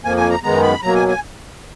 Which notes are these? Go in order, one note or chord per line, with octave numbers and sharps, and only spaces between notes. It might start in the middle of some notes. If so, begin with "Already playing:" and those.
F2 F3 A#3 G#5
G#5
A#5
F#2 D#3 G#3 B3 A#5
B5
B2 F#3 A#3 A#5
G#5
G#5